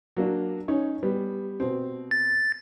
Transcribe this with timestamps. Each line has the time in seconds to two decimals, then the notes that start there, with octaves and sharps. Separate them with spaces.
0.17 F#3 A#3 D4
0.68 C#4 D#4 C#5
1.03 G3 B3
1.60 B2 C4
2.11 A6